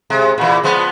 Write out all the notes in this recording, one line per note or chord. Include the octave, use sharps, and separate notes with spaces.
C3 G#3
A#2 E3
F3 G#3 B3